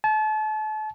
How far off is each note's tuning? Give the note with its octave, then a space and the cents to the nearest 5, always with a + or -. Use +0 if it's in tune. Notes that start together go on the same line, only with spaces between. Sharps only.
A5 -35